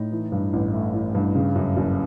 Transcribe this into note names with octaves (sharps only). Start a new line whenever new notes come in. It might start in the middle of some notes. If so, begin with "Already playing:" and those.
Already playing: A2 D#4
E3
G2
A1
A3
E3
G2
C#3
F#2
F#1